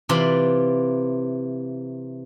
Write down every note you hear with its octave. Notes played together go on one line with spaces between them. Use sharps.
C3 E3 F4 D5 B5 C6